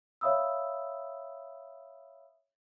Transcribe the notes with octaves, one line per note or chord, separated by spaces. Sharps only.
C#5 E5 F5 B5 D#6 E6